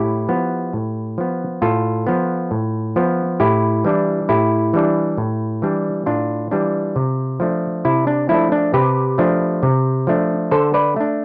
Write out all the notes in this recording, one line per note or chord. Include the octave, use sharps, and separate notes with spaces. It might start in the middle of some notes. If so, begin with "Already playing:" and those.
Already playing: A2 E4 G4
F3 B3
A2
F3 B3
A2 F4 A4
F3 B3
A2
F3 B3
A2 E4 G4
E3 G3 D4
A2 E4 G4
E3 G3 D4
A2
E3 G3 D4
A2 D4 F4
E3 G3 D4
C3
F3 A3 D4
C3 E4
D4
F3 A3 D4 E4
D4
C3 G4 B4
F3 A3 D4
C3
F3 A3 D4
D3 A4 C5
B4 D5
A3 D4